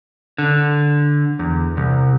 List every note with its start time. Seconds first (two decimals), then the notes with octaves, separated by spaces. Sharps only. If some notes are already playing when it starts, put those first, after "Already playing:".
0.38 D3
1.39 E2
1.77 C2